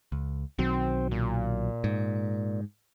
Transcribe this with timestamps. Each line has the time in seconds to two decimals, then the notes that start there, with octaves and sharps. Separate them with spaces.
0.12 C#2
0.59 B1 D#3 F#3 C4
1.11 A#2
1.84 G#2